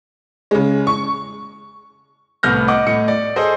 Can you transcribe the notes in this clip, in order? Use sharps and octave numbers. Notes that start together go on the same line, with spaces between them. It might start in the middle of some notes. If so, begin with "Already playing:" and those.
C#3 G#3
C#6
C2 A2 B3 F6 G6 A#6
D#5 F#5 D6
A2 D#5 C#7
D5
G#4 A4 C5 D#5